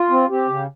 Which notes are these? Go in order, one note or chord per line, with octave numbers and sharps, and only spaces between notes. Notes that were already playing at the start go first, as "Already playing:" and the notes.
Already playing: F4
C4
C4 G4
C#3